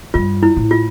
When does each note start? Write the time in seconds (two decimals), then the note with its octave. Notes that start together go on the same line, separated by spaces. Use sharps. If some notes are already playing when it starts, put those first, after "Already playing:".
0.14 G2 F4
0.43 E4
0.57 A2
0.71 F4